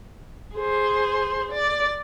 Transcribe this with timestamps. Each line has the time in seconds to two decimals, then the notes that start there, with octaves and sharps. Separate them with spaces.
0.56 G#4 C5
1.52 D5